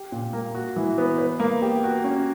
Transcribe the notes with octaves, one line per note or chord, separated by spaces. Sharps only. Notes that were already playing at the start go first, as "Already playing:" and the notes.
Already playing: G4
A#2
A#3
F#4
E3
B3
B4
A#3
G4
F#4
C#4